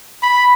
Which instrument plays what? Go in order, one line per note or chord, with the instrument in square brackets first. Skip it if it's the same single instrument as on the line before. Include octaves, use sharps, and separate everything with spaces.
[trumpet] B5